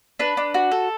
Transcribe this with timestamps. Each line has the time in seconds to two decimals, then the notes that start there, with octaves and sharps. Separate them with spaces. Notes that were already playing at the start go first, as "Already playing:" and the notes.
0.19 D4 B4
0.37 D4
0.54 F#4
0.71 A4